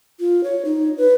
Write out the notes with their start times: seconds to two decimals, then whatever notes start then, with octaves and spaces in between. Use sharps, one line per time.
0.20 F4
0.44 C#5
0.65 D#4
0.98 B4